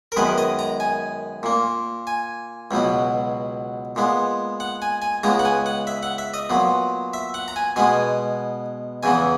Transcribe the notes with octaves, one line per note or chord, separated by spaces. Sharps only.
A#4
F#2 D#3 G#3 B3 B4
D#5
A#5
G#5
A#2 A#3
G#5
C#2 B2 F#3 B3
A#2 G#3 B3
F#5
G#5
G#5
C#2 C#3 G#3 B3 A#5
F#5
G#5
F#5
E5
F#5
E5
D#5
A#2 F#3 B3
E5
F#5
A#5
G#5
B2 G#3 B3 G#5
E2 C#3 E3 B3 G#5